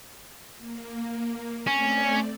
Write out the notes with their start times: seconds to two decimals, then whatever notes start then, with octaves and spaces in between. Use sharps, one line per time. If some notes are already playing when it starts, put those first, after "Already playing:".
0.57 A#3
1.67 A3 C4 C#4 D5